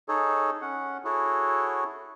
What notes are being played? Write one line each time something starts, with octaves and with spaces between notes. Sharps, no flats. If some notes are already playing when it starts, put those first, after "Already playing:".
D#4 G#4 A4 C#5
C#4 F#5
E4 F#4 G#4 A4 C#5